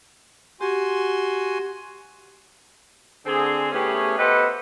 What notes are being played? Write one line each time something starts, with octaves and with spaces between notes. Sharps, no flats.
F#4 G4 G#5 C6
D3 C4 G#4
A2 A3 B3 C#4 G4 G#4
B3 G4 A4 B4 C5 D#5